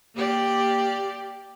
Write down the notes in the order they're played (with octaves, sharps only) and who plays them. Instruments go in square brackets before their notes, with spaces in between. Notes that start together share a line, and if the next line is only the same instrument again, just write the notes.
[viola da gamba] A#3 G4 D5